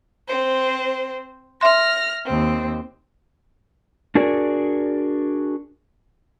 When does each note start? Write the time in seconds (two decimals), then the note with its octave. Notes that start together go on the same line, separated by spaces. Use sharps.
0.27 C4 C5
1.61 E5 C6 F6 A#6
2.25 D#2 C4
4.15 D4 F#4 G#4 A#4 D5